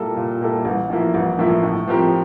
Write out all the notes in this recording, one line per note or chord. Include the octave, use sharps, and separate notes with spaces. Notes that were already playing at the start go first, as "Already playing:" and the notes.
Already playing: A#2 G3 A#3 E4 A4
A#2
G3 A#3 E4 A4
A1
A2 F3 A#3 E4
A1
A2 F3 A#3 E4
A2
F3 C4 G4 A#4